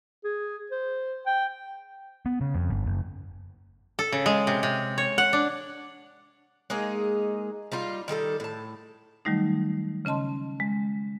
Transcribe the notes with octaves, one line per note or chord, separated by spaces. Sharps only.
G#4
C5
G5
B3
C#3
F2
G1
F#1
A4
C#3
G#3
C3
C3
C#5
F#5
D4
G#3 A#3 D#4 G#4
G3 D#4 F4
D#3 G3 G#4 A4
A2 A5
D#3 F#3 G3 A3 D#4
C#3 C#4 D#5 A5 C6
G#3